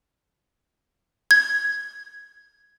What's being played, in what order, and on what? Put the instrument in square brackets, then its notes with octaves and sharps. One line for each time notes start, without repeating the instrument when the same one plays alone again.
[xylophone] G#6